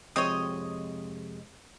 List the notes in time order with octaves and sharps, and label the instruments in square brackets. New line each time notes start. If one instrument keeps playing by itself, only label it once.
[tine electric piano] F2 C3 G#3 [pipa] C4 C#5 [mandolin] D#5